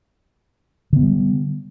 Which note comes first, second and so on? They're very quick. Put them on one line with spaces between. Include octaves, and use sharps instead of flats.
D3 B3 E3 G3